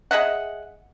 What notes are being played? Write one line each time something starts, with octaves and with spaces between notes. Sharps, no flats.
G#4 D#5 E5 F#5